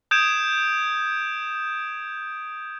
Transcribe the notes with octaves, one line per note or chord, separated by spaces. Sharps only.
D#6 G6 G#6 D7 E7